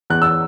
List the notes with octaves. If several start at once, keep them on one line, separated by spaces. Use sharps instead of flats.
E2 F#6
E6